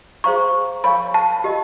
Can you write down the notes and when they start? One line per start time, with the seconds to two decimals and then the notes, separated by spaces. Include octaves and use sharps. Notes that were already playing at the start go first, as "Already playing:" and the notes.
0.24 G#4 C5 F5 A#5 C#6
0.84 A#4 C#5 F5 G#5 B5 C#6
1.14 A5
1.44 G4 A#4 D#5